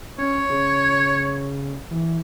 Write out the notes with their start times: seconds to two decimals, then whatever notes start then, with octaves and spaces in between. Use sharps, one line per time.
0.18 C#4 C#5
0.50 C#3
1.91 E3